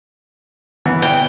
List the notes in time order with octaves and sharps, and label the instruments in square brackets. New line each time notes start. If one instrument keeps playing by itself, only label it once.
[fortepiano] E3 B3
[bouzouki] G5